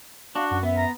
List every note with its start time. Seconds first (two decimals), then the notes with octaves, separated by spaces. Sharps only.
0.35 D4 F#4 F5
0.51 F#2 F#5
0.63 B3 E5
0.77 A#5